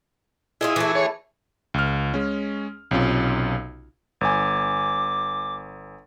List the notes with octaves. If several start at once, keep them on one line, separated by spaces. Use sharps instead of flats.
E4 F4 G#4 A#4 D#5
E3 A3
G#4 C#5
C#2 F6
G#3 C#4
B1 C3 C#4 F4
G1 G#5 D6